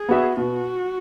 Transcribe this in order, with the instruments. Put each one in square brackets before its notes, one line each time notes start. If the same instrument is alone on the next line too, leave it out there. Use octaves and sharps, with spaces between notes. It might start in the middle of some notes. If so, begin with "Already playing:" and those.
Already playing: [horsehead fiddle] G#4
[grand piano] B3 F#4 E5
[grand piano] B2 [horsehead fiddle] F#4